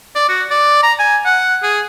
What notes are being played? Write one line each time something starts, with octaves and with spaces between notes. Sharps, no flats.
D5
F#4
D5
A#5
G#5
F#5
G#4